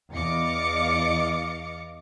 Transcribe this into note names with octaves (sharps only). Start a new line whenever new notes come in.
E2 D#5 F5 D6 A6 C#7